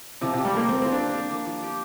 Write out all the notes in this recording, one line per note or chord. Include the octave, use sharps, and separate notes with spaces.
C3 F3
C3
G4
G3
A#3 A#4
A#3 C4
F3 C4
D4
G4
A#4
A#3
F3
G4